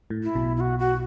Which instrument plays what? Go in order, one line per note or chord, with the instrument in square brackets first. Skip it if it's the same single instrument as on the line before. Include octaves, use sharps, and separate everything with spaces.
[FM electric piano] A2
[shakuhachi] E4
[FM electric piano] B1 B2
[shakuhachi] E4
F#4
F#4